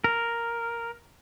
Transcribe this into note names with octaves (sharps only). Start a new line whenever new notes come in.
A#4